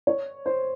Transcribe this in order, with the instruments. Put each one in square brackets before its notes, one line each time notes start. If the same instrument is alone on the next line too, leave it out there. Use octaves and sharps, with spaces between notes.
[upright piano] C#5
C5